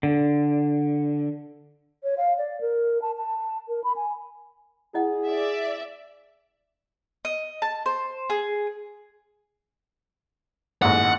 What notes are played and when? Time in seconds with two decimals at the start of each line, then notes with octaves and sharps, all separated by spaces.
0.03 D3
2.03 C#5
2.17 F5
2.38 D5
2.61 A#4
3.02 A5
3.17 A5
3.68 A#4
3.84 B5
3.96 G#5
4.94 E4 G#4 D#5 F#5
5.28 D5 E5
7.25 D#5
7.62 A5
7.86 C5
8.30 G#4
10.82 A1 D#2 G#2 F#5